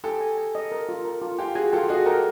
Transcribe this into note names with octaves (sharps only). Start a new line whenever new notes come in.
G4 A4 G#5
G#5
G#5
D#5
A#4
F4
A#4
F4
F4 G4 G#5
F#4 G#4 G#5
F4 G4 A4
F#4 G#4 D#5
G4 A4 A#4